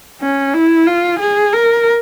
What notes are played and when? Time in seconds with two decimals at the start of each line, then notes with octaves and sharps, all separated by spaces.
0.21 C#4
0.54 E4
0.87 F4
1.19 G#4
1.53 A#4